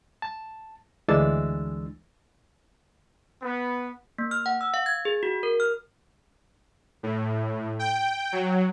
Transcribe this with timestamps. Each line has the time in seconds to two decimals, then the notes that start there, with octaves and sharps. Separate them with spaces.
0.22 A5
1.08 D2 E3 G#3 D4 E6 A6
3.42 B3
4.18 A#3
4.31 F6
4.46 F#5
4.61 E6
4.74 F5
4.86 G#6
5.05 G#4
5.23 F#4
5.43 A#4
5.60 F6
7.03 A2
7.79 G5
8.32 F#3